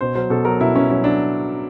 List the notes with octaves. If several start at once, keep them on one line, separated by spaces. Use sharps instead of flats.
B2 C5
F#3 C5
B2 A4
F#3 A#4
B2 E4
B2 C#4
F#3 C#4
F#3 D4